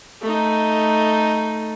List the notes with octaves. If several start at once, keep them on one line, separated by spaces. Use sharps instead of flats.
A3 D#4